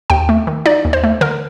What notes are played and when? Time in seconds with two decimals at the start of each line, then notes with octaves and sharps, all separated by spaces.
0.10 D#2 G5
0.29 A3
0.47 D#3
0.66 D#4 D5
0.85 D#2
0.93 C5
1.04 A3
1.21 D3 A#4